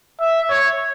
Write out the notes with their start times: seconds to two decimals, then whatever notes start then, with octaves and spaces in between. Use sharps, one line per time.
0.21 E5
0.50 C#5